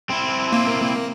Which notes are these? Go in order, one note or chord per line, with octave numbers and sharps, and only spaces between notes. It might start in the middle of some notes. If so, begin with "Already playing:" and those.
C4 E4
A#3